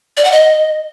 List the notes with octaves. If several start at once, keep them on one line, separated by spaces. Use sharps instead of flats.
D5
F#5
D#5